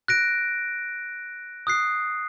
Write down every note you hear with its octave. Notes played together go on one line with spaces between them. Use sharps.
F#6 A#6 D7
D#6 F#6 C7